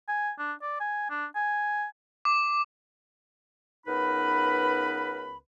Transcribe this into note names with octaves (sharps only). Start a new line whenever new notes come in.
G#5
D4
D5
G#5
D4
G#5
D6
C#2 B3 D#4 A#4 B4 B5